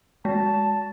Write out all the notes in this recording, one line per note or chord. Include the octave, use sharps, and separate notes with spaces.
G#3 A5